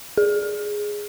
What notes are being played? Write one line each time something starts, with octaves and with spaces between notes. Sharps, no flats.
G#4